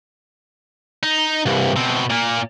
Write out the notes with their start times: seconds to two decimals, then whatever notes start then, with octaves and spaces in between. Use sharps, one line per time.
1.03 D#4
1.46 C2 G2
1.76 B2 C4
2.10 A#2 A#3